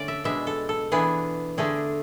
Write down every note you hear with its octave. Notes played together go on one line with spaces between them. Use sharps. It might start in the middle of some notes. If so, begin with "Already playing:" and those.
Already playing: D3 A3 C#4 D5
E5
B2 G#3 D4 E5
A4
A4
E3 B3 D4 G#4
D3 A3 D4 G#4